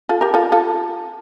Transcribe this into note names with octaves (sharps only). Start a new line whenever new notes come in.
F4 A4
G4 A#4
F4 A4
F4 A4